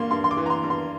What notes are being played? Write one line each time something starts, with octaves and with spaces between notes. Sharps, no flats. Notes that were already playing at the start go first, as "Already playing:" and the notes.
Already playing: G2 A#3 C6
G2 C6
C6
D6
E3
A#5
C6
G2
C6